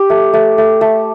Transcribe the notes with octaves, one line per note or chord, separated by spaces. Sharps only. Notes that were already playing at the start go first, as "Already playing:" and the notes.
Already playing: G4
A3
A3
A3
A3